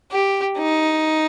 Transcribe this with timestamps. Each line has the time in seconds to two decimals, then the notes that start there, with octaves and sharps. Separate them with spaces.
0.11 G4
0.57 D#4